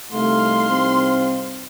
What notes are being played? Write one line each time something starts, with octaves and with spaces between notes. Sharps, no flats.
C2 A3 D#4 F5 C6
C4